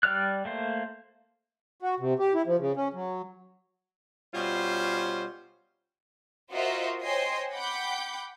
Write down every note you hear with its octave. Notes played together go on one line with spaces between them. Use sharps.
G3 D5 F6 F#6
A3 A#3 C5
F#4
C3
G4
E4
F3
C#3
C#4
F#3
B2 G3 C#4 F4 C5
F4 F#4 A#4 C5 D#5 E5
C5 C#5 D#5 G5 G#5 C6
F#5 G5 B5 D6 G6